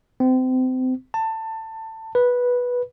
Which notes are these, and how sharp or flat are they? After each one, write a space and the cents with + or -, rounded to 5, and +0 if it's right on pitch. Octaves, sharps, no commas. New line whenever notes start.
C4 -30
A5 +20
B4 -10